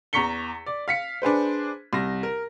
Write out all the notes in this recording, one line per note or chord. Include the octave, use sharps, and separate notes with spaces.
E2 A#5 C#6 B6 C#7 G7
D5
F5 B6 C#7
D4 G#4 B4 C5
C2 A#6
A#4